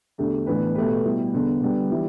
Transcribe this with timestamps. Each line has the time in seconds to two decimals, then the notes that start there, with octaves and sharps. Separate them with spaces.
0.18 E2 D3 A3 D4 G4
0.47 A2 E3 B3 D4 B4
0.75 B2 A3 G4 B4
1.04 B2 G3 E4
1.33 E2 D3 B3
1.62 D3 G3 B3
1.91 E3 G3 E4 G4